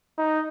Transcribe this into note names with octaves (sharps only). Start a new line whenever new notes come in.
D#4